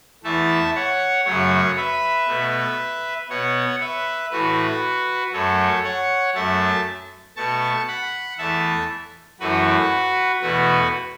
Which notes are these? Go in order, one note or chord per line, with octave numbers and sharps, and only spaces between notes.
E2 E3 A3 E5 A5
C#5 F#5
F#2 C#3 F#3 A3 C#5 F#5
B4 E5
B2 A3
B2 B3 C#5 F#5
B4 E5
A2 E3 A3 F#4 B4
F#2 F#3 A3 A4 C#5
C#5 F#5
F#2 F#3 A3 E5 A5
B2 A3 A5 C#6
F#5 B5
E2 E3 A3 E5 A5
F#2 E3 A3 F#4 B4
E2 B2 A3 F#4 B4